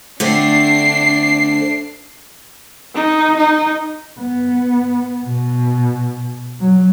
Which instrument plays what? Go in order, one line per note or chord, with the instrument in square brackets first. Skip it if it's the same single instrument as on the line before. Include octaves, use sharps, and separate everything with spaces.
[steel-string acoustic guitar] D3 A3 C4 [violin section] D4 C7
[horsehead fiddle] D#4
D#4
[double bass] B3
B2
F#3